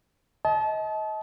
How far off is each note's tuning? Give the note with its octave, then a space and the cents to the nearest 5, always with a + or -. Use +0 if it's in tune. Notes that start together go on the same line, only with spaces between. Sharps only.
D#5 +30 A5 -30